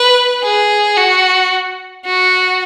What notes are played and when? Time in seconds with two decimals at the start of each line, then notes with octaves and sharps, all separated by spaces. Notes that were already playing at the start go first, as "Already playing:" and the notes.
Already playing: B4
0.43 G#4
0.97 F#4
2.05 F#4